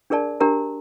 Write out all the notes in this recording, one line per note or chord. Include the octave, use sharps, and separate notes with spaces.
D4 G#4 A#4 D5 A5
D4 G4 A#4 A#5